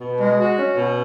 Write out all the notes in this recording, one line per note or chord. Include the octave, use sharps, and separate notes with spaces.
B2
G#3
F#4
C#4
B2